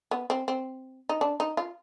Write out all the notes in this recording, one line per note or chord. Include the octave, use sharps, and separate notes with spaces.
B3
C4
C4
D#4
D4
D#4
F4